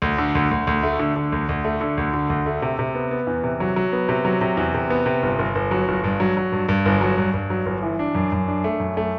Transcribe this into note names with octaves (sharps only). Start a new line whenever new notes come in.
D2
D3
D2
D2
D2
A3
D3
D3
D2
D2
A3
D3
D2
D3
D2
A3
C3
C3
B3
B3
E2
C3
F#3
F#3
B3
C3
F#3
C3
E2
C3
B3
C3
G1
G1
G1
F#3
G1
G2
F#3
F#3
G2
G2
G1
F#3
G2
G2
F#3
G1
E3
D4
F#2
F#2
D4
A3
F#2
A3